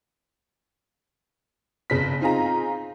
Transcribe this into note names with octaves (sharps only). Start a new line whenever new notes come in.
G1 C#3 B6
C4 D#4 F4 G#4 A#5